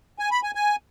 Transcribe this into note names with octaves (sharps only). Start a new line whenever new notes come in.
G#5
B5
G#5
G#5